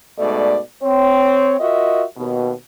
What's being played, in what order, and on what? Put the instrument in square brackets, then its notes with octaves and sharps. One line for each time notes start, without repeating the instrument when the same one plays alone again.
[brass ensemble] G#2 B2 A3 D5
C4 C#5
F4 F#4 A#4 D#5 E5
D#2 B2